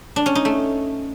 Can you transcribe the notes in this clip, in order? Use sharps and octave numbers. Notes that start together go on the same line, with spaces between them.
D4
C#4
D#4
A3